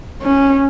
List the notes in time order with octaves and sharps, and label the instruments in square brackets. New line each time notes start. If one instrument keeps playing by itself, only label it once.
[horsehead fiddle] C#4